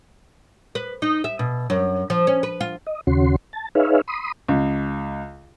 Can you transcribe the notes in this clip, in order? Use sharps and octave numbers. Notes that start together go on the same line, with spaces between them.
B4
D#4
E5
B2
F#2
F3
C#4
B4
F4
D#5
D#2 C#3 C#4 F#4 C6
A5
D#4 G#4 B4 C#5 E5 F5
B5 C6 D#6
C#2